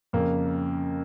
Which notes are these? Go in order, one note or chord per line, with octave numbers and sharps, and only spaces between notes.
F2 C#3 A#3